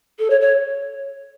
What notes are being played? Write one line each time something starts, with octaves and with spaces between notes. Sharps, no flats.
A4
C#5
C#5